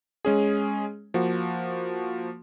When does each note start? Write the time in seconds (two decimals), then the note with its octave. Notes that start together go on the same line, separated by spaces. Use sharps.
0.25 G#3 C#4 G#4
1.14 F3 A#3 F#4